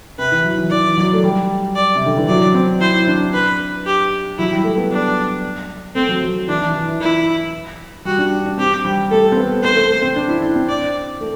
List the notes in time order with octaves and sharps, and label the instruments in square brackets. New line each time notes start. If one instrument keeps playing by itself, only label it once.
[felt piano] C3 [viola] B4
[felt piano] E3
F#3
E3
[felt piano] E3 [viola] D5
[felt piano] F#3
A3
G3
[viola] D5
[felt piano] C3
D3
E3
[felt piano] F#3 [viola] D5
[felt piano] C4
[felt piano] E4 [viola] C5
[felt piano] D4
[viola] B4
G4
[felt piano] F#3 [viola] E4
[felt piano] G3
A3
B3
[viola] D4
[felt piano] A3 [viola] C4
[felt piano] F#3
F#3
[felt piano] E3 [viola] D4
[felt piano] E3
E3
E3
[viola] E4
[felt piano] G3 [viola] F#4
[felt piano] D4
D4
[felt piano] C4 [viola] G4
[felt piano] G3
[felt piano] A3 [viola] A4
[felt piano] C4
B3
[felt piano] A3 [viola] C5
[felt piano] A3
A3
C4
D4
E4
D4
C4
[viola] D5
[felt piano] A3